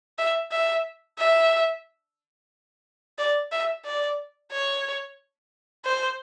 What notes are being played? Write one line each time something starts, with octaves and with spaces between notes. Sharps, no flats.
E5
E5
E5
D5
E5
D5
C#5
C5